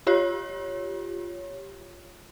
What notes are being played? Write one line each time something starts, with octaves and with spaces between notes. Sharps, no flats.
F4 G4 C#5